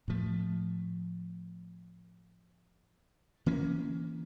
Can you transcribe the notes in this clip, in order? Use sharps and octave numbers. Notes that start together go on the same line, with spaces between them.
A2 F3 A3
E3 A#3 C#4